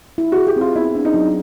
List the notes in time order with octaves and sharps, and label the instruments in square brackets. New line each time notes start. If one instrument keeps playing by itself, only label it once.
[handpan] E4
[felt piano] F#4 [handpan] G#4
[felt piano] G4
[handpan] C4 [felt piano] F4
[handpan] B3 [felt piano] E4
[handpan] D4
[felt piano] D#4
[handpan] F#3